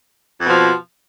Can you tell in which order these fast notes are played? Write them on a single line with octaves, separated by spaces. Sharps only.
F2 B2 F3